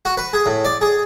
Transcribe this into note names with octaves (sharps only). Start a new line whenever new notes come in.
F#4
B4
G#4
A2
D5
G#4